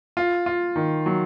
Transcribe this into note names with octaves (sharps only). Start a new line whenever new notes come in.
F4
F4
D#3
F#3